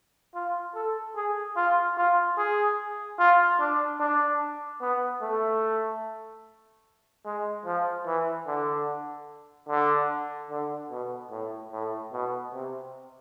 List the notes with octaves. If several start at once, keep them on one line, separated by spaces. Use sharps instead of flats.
F4
A4
G#4
F4
F4
G#4
F4
D4
D4
B3
A3
G#3
F3
E3
D3
D3
D3
B2
A2
A2
B2
C3